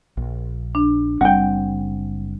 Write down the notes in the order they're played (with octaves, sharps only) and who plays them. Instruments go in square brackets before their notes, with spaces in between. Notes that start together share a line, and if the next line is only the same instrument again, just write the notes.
[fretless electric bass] A#1
[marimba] D4
[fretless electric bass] F#1 C4 [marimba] G3 [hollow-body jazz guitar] F#5 G5